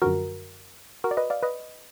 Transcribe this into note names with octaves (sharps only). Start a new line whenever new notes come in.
F#2 D3 F3 F#4 A#4
F#4 A#4
D5
B4 D#5
D5 F5
B4 D#5